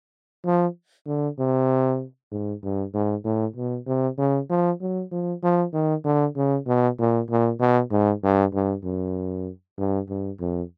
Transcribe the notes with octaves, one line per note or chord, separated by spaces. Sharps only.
F3
D3
C3
G#2
G2
G#2
A2
B2
C3
C#3
F3
F#3
F3
F3
D#3
D3
C#3
B2
A#2
A#2
B2
G#2
G2
G2
F#2
G2
G2
F2